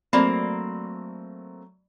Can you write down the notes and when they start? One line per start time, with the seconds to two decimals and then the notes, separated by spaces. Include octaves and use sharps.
0.13 F#3 A3 A#3 C4 D5 B5